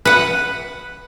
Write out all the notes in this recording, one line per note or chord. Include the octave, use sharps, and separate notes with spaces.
B4 F#5